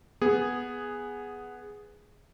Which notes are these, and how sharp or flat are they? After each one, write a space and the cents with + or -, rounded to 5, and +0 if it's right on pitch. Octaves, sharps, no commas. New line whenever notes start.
B3 +0 G#4 +0